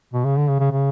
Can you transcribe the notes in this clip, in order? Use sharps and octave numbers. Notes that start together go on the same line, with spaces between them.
B2
C#3
D3
C#3
C#3
C#3